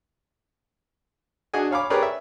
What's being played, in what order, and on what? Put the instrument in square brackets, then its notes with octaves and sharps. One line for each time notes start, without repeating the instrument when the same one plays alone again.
[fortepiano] D4 F#4 G#4 D#5 G#5
C#5 F5 B5 D6
G4 G#4 A#4 B4 C#5 D5
E5